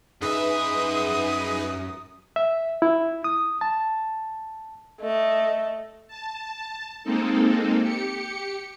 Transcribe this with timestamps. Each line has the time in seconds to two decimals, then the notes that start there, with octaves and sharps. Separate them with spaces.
0.22 F#2 D#4 G#4 B4 E5 D#6
2.36 E5
2.82 E4
3.24 D#6
3.61 A5
5.01 A3 D#5
6.08 A5
7.04 G#3 A#3 C4 D#4 A4
7.80 G4 C#7